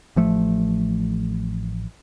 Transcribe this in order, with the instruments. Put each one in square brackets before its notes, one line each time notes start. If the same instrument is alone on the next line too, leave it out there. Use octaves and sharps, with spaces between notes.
[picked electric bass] A1 F3 A3